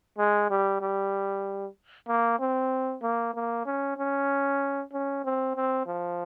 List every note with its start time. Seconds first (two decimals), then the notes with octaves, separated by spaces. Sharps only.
0.18 G#3
0.50 G3
0.81 G3
2.08 A#3
2.39 C4
3.02 A#3
3.34 A#3
3.66 C#4
3.97 C#4
4.92 C#4
5.24 C4
5.55 C4
5.86 F3